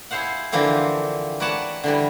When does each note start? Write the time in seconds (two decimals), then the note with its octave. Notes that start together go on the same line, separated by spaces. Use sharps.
0.11 E4 G#4 C5 F5 F#5
0.52 D3 E3 F3 A#3 C4
1.40 A#4 B4 C#5 D5 F#5 A5
1.83 D3 E3 G3